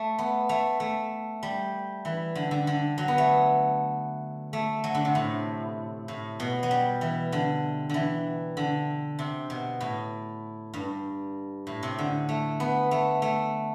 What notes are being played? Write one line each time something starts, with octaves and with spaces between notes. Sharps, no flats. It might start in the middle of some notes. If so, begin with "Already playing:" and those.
Already playing: A3
B3
A3
A3
G3
E3
D3
D3
D3
F#3
B3
A3
A3
F#3
D3
C3
A2
A2
B2
F#3
G3
E3
D3
D3 E3
D3
C3
B2
A2
G2
A2
C3
D3
A3
B3
A3
A3